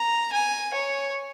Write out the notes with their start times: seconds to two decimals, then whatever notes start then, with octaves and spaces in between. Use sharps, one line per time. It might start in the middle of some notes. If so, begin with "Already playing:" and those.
Already playing: A#5
0.33 G#5
0.74 C#5